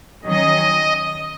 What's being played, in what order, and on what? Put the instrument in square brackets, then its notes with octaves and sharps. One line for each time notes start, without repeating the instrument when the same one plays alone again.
[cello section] D#3 F#3 C#4 [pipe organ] D#5